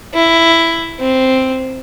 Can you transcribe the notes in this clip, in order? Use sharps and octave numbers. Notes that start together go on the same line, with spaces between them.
E4
C4